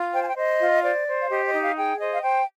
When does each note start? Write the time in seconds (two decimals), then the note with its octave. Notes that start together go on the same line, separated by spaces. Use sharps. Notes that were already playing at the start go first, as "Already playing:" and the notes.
Already playing: F4
0.13 C5 G5
0.21 G#5
0.28 G5
0.37 C5 D#5
0.60 F4
0.83 C5 D5
1.06 C5
1.18 F5
1.30 G4 D#5
1.45 D#5
1.53 D#4
1.61 F5
1.76 G#4 G5
1.99 C5 D#5
2.12 F5
2.23 C5 G5